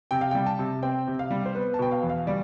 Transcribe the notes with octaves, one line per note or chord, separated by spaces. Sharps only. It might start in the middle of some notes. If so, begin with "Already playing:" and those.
C3 G5
F5
G3 G5
A5
C3
C4 G5
C3
F5
G3
C5
B3 B4
A5
B2 G5
F5
E2
F5
G3 D5